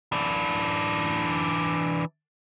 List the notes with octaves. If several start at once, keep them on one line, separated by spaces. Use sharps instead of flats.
E3 D4